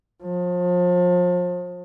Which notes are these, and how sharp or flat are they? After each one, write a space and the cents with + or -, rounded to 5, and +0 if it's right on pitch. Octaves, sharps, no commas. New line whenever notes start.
F3 +35